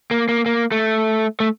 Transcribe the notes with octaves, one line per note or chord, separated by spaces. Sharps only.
A#3
A#3
A#3
A3
A3